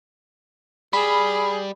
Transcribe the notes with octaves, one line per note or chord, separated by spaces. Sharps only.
G3 G#4 B5